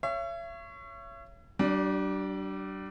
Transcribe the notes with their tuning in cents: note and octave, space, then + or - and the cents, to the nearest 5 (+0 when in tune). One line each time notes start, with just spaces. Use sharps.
C#5 +0 E5 +40
G3 -40 D4 +0